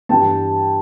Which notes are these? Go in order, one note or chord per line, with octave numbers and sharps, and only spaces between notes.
G2 E3 G3 G5 A5